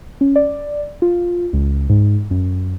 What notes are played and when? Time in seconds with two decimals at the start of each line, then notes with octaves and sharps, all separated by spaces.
0.21 C#4
0.36 D5
1.02 F4
1.53 C#2
1.90 G#2
2.31 F#2